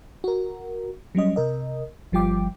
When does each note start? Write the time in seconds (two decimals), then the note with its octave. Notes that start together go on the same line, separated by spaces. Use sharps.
0.24 F#4 A#4
1.15 F#3 G3 C#4 D#5
1.36 C3 A#4 D#5
2.12 G1 F3 G3 F4 G5 D6